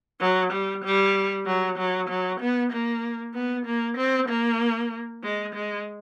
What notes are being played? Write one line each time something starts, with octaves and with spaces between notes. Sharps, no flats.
F#3
G3
G3
F#3
F#3
F#3
B3
A#3
B3
A#3
C4
A#3
G#3
G#3